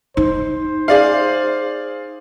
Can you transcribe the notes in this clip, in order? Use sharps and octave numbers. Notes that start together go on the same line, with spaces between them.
D#4 C5
G#4 D5 F5